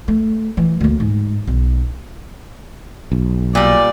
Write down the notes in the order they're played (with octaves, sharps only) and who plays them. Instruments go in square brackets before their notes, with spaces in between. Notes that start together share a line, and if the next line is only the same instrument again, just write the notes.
[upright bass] A3
E3
D2 A#3
G#2
B1
[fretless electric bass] B1
[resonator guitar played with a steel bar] A#2 G3 [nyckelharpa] D5